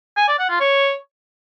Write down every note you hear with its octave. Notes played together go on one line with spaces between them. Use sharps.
G#5
D5
F#5
F4
C#5